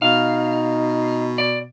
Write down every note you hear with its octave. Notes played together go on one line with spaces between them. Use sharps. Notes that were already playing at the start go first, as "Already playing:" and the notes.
B2 D#4 F5
D5